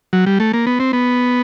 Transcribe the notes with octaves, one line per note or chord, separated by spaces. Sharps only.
F#3
G3
A3
A#3
B3
C4
B3